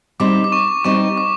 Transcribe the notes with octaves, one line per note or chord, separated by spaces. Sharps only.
G3 C4 D#4 D6
D6
C#6
G3 C4 D#4 C#6
D6